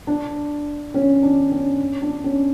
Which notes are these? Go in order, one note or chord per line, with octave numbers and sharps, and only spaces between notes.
D4
C#4
D4
C#4
D4
C#4